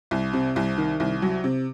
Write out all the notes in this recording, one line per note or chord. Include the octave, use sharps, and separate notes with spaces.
C2
C3
C2
D#3
C2
F#3
C3